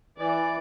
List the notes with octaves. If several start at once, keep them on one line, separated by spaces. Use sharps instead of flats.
E3 D5